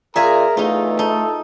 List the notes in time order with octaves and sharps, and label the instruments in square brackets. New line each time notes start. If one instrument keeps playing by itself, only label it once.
[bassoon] A#2 [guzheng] G#4 E5 G#5 [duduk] A#4 [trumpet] A#5
[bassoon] E2 [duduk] A3 [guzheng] D#4 F4
[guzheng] D#4 [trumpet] A4